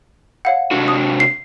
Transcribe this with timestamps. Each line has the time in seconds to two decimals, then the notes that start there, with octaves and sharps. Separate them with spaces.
0.45 C#5 F5 F#5
0.71 C3 D4 F#4
0.88 D#6
1.20 C7